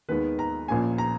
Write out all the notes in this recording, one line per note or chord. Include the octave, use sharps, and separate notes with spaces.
D#2 D#3 G#3 B3 B4
A#5
A#1 A#2 A#3 C#4 G#5
A#5